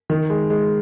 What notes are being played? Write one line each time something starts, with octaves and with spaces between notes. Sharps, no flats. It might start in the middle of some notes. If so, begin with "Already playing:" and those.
D#3
G#3
G#3